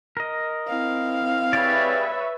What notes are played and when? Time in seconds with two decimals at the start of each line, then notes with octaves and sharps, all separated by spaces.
0.17 A#4 D#5
0.68 C4 E4 F5
1.53 G4 G#4 B4 C#5 D5 E5